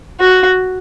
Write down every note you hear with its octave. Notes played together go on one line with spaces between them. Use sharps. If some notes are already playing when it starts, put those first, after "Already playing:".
F#4